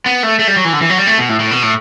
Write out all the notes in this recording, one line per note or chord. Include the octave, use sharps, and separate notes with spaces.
B3
A3
A3
G3
F#3
E3
D3
E3
F#3
G3
A3
B2
A2
A2
B2
A2